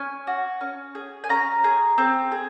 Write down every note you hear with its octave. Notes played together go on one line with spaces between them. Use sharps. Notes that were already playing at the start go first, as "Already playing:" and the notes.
Already playing: C#4 G#5
F#4
C#4
G#4
G#5
C#4 A#5
G#4
C4
G#4